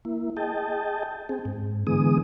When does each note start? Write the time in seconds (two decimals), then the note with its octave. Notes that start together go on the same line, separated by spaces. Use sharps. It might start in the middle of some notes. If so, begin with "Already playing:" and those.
0.05 A#3 E4
0.37 G#4 D#5 G5 A5
1.29 C4 G#4
1.45 G#2
1.87 D3 E3 G#3 B3 G#4 D#6